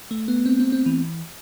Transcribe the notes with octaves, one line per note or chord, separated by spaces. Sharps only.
A3
B3
C4
C4
C4
E3